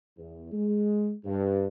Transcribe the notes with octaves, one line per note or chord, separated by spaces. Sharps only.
E2
G#3
G2